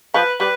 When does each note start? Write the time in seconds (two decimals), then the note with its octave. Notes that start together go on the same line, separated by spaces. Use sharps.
0.14 F3 B4
0.40 G3 B4